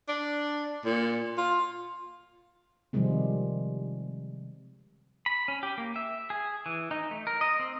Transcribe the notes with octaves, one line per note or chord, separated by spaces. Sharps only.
D4
A#2
F4
C3 D#3 F3 G3 G#3 C4
B5
C#4
G4
A#3
E5
G#4
E3
D#4
A3
A#4
D#5
C4